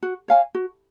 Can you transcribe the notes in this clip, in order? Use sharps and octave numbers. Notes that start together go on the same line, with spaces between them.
F#4
C#5 F5 G#5
F#4